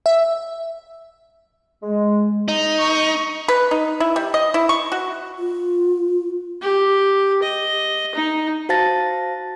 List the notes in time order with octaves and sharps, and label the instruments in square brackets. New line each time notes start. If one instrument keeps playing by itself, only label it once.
[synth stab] E5
[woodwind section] G#3
[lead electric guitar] D#4
[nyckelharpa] C#6
[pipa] B4
D#4
E4
G3
D#5
E4
C#6
F#4
[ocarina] F4
[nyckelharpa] G4
D#5
D#4
[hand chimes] F#4 C5 F5 A5 A6 A#6